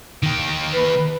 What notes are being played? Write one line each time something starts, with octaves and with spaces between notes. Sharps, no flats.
D#3 G4
B4